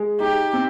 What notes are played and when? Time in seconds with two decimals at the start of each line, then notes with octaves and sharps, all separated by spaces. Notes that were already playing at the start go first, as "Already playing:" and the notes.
Already playing: G#3
0.20 D#4 G4
0.53 C4